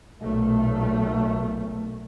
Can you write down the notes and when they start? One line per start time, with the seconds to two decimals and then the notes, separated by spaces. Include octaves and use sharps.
0.20 B1 A#2 A3